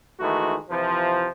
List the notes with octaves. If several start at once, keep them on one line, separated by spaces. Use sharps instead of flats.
D#3 E3 G#3 A3 F#4
C3 E3 F3